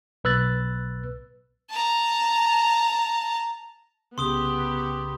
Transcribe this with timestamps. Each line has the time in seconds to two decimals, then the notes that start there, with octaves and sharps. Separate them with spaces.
0.24 B1 B4 E6 F#6 A6
1.70 A5 A#5
4.18 C2 C#3 B3 G4 C6 D#6 G7